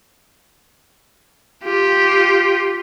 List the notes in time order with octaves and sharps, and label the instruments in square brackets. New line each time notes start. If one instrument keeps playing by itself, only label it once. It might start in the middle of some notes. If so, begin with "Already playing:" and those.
[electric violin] F4 G4